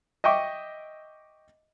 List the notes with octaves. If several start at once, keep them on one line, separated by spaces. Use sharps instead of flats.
D#5 E5 G5 C#6 D6